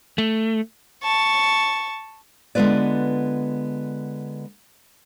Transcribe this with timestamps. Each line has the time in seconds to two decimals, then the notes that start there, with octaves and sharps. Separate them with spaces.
0.18 A3
1.03 A5 C#6
2.55 D3 G#3 B3 F4 B4 D5